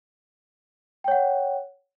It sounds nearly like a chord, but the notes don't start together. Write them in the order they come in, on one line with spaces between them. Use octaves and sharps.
G5 C#5 F#5